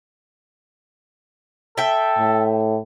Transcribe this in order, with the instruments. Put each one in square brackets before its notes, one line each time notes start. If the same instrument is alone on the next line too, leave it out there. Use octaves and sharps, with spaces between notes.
[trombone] A4 [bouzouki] E5 G5
[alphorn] A2